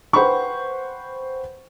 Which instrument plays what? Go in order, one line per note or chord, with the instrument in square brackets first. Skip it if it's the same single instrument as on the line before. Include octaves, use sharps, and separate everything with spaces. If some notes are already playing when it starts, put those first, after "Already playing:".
[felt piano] B4 C5 F#5 G5 B5 C#6